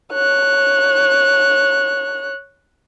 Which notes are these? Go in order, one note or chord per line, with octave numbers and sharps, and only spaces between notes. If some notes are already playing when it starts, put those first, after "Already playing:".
C#5 F#6